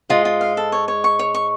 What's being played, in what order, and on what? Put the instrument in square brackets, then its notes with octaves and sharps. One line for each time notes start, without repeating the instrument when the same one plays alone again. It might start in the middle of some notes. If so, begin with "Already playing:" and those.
[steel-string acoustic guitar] G#2 G#3 [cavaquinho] F4
[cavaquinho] F4
F5
A4
C#5
C#5
C#6
C#5
C#6